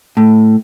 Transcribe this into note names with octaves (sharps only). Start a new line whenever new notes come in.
A2